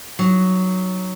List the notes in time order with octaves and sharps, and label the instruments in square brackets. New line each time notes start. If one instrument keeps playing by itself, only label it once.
[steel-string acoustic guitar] F#3 [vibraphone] D#4